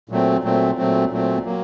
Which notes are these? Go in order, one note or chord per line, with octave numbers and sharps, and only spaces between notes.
A#2 F#3 A3 C4
A#2 F#3 A3 C4
A#2 F#3 A3 C4
A#2 F#3 A3 C4
F#3 A#3